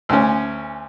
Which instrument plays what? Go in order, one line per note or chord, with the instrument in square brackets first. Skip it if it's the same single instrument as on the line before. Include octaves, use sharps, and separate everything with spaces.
[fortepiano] D2 C#4